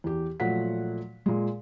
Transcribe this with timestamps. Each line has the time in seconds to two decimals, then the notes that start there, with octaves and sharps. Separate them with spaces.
0.04 E2 G4
0.40 A#2 F3 F#3 A3 F#5 B6
1.26 A#2 G#3